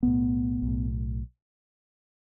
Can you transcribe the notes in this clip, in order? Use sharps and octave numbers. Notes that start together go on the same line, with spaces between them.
B1 A2 B3
B1 A2